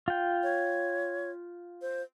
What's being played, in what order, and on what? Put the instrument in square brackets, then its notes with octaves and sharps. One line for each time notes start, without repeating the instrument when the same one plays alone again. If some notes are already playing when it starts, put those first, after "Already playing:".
[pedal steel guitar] F4 G5
[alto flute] C#5
C5